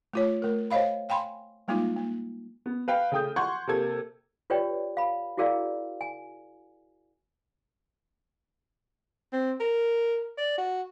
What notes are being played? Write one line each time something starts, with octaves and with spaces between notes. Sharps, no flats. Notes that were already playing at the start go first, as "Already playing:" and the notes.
A3 F4 C#5
A3 A#4
C5 C#5 D#5 F5 B5
F5 G5 G#5 B5 C6
G3 G#3 A#3 D#4 F4
A#3
B3
B4 F5 G5
C#3 A3 G5 D#6 G6
F#5 C6 C#6 G6 G#6
C3 A#3 A4 G#6
F4 G4 B4 C#5 D5 G5
F5 B5
E4 F#4 G#4 A#4 D5 F5
G#5
C4
A#4
D5
F#4